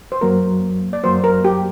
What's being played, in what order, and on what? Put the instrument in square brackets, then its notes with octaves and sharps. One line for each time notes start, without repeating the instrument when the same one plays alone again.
[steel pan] C5
[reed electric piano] F#2 F#3 A#3 [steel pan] A#4
[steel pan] D5
[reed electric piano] F#2 F#3 A#3 [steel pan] C5
[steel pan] A#4
G4